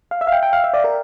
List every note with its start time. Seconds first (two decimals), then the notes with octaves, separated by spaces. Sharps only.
0.11 F5
0.21 E5
0.27 F5
0.32 G5
0.43 G5
0.53 F5
0.64 E5
0.74 D5
0.84 A#4